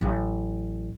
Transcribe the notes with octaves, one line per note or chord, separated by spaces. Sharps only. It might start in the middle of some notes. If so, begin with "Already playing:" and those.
A1 F#3